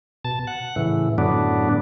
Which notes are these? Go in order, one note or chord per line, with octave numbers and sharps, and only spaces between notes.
B2 A5
F#5
A2 C#3 E3
F#2 A2 D3 F#3 B3 D4